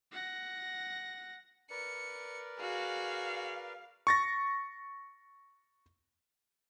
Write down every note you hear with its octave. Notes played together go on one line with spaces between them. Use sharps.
F#5 A#6
A#4 B4 D5 C#7
F#4 G#4 F5
C#6 A6 A#6